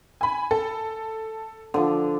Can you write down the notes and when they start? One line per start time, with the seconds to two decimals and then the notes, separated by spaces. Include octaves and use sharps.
0.21 G#5 B5
0.51 A4
1.74 D3 F3